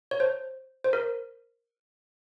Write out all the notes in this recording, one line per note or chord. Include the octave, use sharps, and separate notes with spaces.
C#5
C5
C5
A#4